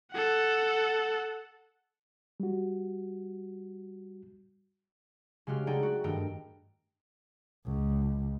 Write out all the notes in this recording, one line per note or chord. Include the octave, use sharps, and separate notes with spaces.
A4 F#5
G3 F#4
C#3 G#3 F#4 G4 F6
G#3 A3 D#4 D5 F#5 G5
F#4
G2 D#3 A3 A#4 G5
C#2